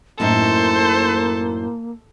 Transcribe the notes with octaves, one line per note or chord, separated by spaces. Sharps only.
F#2 A2 A#3 D#4 A4 C5